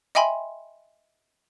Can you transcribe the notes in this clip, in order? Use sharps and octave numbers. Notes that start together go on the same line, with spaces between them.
D#5 E5 G5 G#5 B5 C6